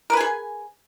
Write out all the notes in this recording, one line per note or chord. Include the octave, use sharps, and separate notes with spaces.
G#4 A#4 B4 G#5